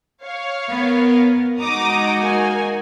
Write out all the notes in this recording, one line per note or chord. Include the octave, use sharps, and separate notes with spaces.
C#5 F5
B3 A#4
G#3 D#4 F#4 A#5 D6 D#6
A#3 G#5